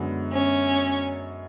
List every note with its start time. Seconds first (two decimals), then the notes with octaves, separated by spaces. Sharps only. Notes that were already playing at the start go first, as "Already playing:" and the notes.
Already playing: F#2 D3 G#3 B3
0.32 C#4